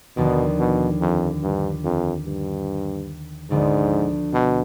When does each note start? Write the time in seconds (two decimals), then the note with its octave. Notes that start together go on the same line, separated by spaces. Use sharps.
0.17 D#2 B2 D3 F3 B3 F4
0.59 B2
1.01 F2
1.43 G2
1.84 F2
2.25 G2
3.50 D2 G#2 D3 F3 B3
4.33 B2